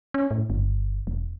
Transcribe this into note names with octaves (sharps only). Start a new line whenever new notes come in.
C#4
A2
G1
E1